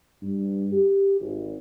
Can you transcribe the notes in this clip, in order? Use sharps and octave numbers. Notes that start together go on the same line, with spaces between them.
G2
G4
G#1